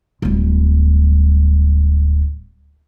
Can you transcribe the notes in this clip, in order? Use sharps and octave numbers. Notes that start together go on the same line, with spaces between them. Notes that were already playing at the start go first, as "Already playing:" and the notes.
D1 G3